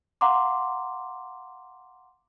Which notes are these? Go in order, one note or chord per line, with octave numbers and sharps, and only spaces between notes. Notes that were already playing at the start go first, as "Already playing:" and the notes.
F5 F#5 A#5 C6 D6